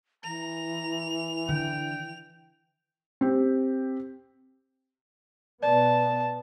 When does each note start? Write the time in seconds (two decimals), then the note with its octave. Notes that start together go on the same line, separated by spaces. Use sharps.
0.24 E3 A#5 F7
1.49 D3 G5
3.21 C4 G4
5.63 B2 B3 D5 A5